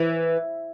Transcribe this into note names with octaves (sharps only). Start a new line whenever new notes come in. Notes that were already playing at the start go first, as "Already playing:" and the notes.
Already playing: E3